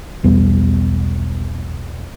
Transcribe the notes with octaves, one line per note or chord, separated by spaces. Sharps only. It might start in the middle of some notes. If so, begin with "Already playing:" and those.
B1 E2 G3 B3